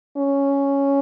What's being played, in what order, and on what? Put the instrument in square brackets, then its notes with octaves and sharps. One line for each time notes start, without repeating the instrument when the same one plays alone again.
[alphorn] C#4